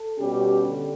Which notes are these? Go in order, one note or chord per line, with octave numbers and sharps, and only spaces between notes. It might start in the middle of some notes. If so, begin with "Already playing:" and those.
Already playing: A4
B2 G3 C#4 G4
D3